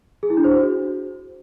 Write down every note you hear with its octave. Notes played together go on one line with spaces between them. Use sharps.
G#4
E4
D4
C5
F#4